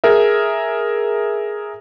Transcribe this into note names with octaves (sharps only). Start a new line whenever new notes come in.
G#4 A#4 E5